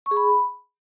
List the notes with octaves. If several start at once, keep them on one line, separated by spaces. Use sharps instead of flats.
C#6
G#4
B5